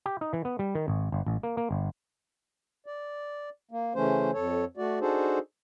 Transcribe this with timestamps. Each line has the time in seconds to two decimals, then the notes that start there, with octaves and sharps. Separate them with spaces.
0.06 G4
0.21 D#4
0.33 E3
0.45 B3
0.59 G3
0.75 D#3
0.88 G#1
1.12 G1
1.27 A1
1.43 A#3
1.57 A#3
1.71 G1
2.86 D5
3.71 A#3
3.95 C#3 E3 A3 C#4 C5
4.33 F2 A4 C#5
4.77 A3 F#4 D5
5.01 D4 D#4 F#4 G#4 A4 C5